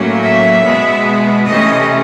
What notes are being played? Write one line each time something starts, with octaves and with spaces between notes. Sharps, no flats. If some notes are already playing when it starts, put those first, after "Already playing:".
Already playing: A2 F#3 A#3 C#4
E5
B2 G#3 B3
C3 E3 A3 C#4 D#5